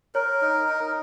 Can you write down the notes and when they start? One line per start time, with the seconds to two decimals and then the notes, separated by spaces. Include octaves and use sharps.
0.15 A#4 C#5
0.42 D#4
0.69 D#4